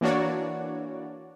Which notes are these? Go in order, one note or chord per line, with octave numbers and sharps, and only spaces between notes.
E3 A#3 D4 F#4 C#5 D5